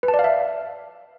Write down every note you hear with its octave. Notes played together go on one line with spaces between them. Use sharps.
B4
A5
D5
F5
E5